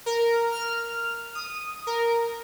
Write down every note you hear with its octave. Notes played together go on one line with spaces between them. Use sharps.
A#4
F6
D#6
A#4